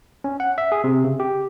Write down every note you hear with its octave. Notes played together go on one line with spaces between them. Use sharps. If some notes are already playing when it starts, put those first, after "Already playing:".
C#4
F#5
E5
G#4
C3
C#3
G4